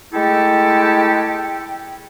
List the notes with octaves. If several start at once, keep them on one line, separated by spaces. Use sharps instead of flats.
G#3 A3 E4 G4 A4 G5